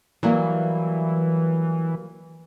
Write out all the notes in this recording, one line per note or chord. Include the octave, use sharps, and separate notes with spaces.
E3 F#3 G3 A#3